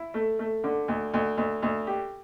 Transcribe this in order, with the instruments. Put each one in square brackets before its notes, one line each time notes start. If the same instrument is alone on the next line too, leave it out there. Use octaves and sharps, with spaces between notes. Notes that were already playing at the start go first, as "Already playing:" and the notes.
Already playing: [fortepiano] E4
A3
A3
D3
D2
D2
D2
D2
G4